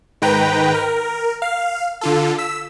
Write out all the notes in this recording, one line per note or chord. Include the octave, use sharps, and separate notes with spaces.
G#2 D#3 B4 G5 A#5
A#4
F5
D3 F4 A4
E6 B6